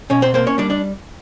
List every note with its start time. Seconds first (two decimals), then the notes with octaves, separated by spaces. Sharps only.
0.10 B2 C#4 C#5
0.22 C4 C5
0.34 A#3 C4 C5
0.47 C#4 C#5
0.58 G3 D4 D5
0.70 D4 D5